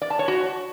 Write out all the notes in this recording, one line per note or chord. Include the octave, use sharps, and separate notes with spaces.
D5
A5
C#5
F#4